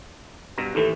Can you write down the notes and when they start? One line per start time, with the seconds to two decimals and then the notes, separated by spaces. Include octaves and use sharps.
0.58 G2 B2 A#5
0.75 D#2 A2 E3 A4